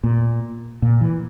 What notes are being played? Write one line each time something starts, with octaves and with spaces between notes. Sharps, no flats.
A#2
A#2
E3